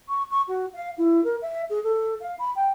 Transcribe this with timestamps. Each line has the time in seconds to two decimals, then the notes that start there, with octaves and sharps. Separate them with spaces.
0.09 C#6
0.31 C#6
0.48 F#4
0.74 F5
0.98 E4
1.24 A#4
1.42 E5
1.70 G#4
1.84 A4
2.21 F5
2.39 B5
2.56 G5